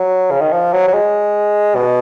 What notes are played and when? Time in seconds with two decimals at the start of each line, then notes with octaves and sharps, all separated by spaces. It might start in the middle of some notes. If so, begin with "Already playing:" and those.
Already playing: F#3
0.31 C#3
0.41 D#3
0.52 F3
0.73 F#3
0.88 F#3
0.93 G#3
1.75 B2